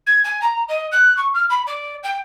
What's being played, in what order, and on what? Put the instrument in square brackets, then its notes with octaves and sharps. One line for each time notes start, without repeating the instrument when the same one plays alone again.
[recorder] G#6
G#5
A#5
D#5
F#6
C#6
F6
B5
D5
G5